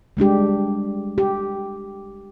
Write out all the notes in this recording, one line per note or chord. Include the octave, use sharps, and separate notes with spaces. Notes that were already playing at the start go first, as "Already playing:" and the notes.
G3 G#3 D4 G4
G4